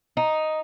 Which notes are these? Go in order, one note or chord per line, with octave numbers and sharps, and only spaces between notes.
D#4